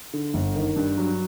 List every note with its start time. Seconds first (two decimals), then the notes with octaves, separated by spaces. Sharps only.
0.13 D3
0.34 G1
0.55 D#3
0.76 G2
0.98 F#3